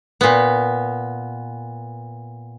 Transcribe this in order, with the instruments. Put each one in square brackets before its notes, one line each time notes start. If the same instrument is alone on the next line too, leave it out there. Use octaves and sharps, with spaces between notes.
[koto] A#2 B3